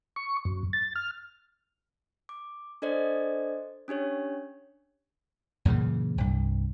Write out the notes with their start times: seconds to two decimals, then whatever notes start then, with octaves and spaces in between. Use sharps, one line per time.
0.16 C#6
0.45 F#2
0.73 A6
0.96 F6
2.29 D6
2.82 D4 A4 C5 D5 D#5
3.88 C#4 D4 G4 C#5
5.65 F#2 A#2 C#3 E3
6.18 C2 G2